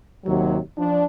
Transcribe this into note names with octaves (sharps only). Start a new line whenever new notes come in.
D#2 C3 F#3
F3 D4